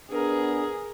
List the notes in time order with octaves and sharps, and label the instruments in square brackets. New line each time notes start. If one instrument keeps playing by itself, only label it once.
[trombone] B3 [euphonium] D4 [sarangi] G#4 [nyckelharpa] A#4